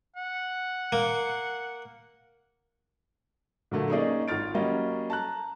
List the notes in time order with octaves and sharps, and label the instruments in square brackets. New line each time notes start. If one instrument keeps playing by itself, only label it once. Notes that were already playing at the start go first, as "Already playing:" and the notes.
[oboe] F#5
[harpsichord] A#3
[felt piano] A#2 D3 F#3 A3 A#3
A#3 C#4 D#4 G#4 D5 D#5
G#1 F4 F6 A6 D7
F#3 G3 A#3 C#4 D#5
A5 A#5 F#6